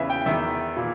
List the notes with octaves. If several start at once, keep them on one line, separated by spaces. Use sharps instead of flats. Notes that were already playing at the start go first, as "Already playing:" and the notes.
Already playing: E2 C#3 E3 E5
G5
E2 D#3 E5
A#2